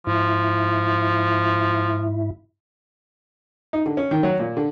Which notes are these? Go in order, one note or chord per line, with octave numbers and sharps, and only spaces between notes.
G#2 F3 E4 E5
D#4
D3
C#4
D#3
F#3
A#2
D3